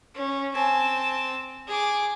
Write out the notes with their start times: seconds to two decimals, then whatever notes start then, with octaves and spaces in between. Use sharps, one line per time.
0.15 C#4
0.55 C4 G#5 A5
1.68 G#4 D6